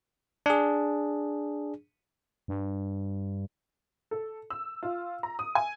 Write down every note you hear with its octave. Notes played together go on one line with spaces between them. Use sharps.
D4 G#4
G2
A4
E6
F4
A#5
D#6
G#5